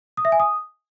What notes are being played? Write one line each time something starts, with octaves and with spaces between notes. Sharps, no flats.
D#6
E5
G#5
D#6